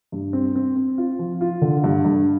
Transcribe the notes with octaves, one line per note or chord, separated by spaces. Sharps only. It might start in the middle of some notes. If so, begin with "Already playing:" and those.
G2
C4
C4
C4
F4
F3
F4
D3
G2
G2